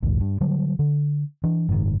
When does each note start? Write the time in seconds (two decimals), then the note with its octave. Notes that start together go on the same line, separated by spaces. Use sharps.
0.03 A#1 D#2 G#2
0.20 G2
0.41 D3 F#3 G3
0.79 D3
1.44 E3 D4
1.69 F#1 G#2 B2 D#3